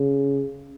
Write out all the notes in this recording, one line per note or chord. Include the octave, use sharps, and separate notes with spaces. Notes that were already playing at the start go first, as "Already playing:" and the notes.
Already playing: C#3